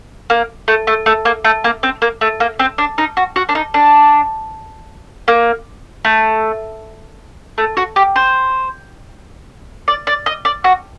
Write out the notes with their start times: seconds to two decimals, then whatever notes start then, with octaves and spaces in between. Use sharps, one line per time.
0.30 A#3
0.68 A3
0.87 A3
1.06 A3
1.25 A#3
1.45 A3
1.64 A#3
1.83 C4
2.02 A#3
2.21 A3
2.40 A#3
2.59 C4
2.78 D4
2.98 D#4
3.17 F#4
3.36 F#4
3.49 D4
3.55 D#4
3.74 D4
5.28 A#3
6.05 A3
7.58 A3
7.77 F#4
7.96 G4
8.16 C5
9.88 D5
10.07 D5
10.26 D#5
10.45 D5
10.64 F#4